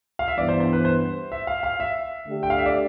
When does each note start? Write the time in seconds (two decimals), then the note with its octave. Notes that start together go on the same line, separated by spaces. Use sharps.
0.19 F5
0.28 E5
0.37 G2 E3 B3 D5
0.49 C5
0.60 C5
0.73 B4
0.85 C5
1.32 E5
1.47 F5
1.63 F5
1.80 E5
2.27 D3 A3 D4 G4
2.43 G5
2.50 F5
2.58 E5
2.66 D5